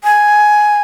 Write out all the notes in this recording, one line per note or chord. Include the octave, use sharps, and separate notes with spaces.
G#5